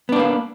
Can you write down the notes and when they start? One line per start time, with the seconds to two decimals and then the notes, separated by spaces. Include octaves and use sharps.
0.09 B3
0.12 D4
0.16 B4
0.20 A#3